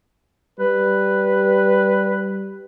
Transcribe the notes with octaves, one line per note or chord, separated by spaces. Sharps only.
G3 B4